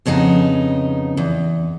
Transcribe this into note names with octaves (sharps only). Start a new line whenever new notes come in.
F2 C#3 B3 D4 D#4
E2